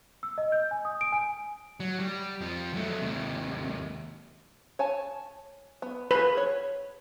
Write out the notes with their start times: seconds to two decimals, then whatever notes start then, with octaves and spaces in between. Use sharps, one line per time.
0.23 E6
0.38 D#5
0.52 G6
0.71 G#5
0.85 D#6
1.01 D7
1.12 G#5
1.80 F#3
1.99 G3
2.41 F2 F3
2.74 F#3 A3
3.01 D#2 C3
4.79 C#5 G#5 A5
5.82 B3
6.11 F4 G#4 B4
6.37 C#5